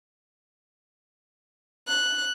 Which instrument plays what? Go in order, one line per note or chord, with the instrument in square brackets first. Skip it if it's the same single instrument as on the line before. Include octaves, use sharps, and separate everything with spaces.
[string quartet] F#6